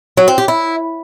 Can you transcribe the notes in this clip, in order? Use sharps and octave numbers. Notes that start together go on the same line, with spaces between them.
F#3
C4
G4
E4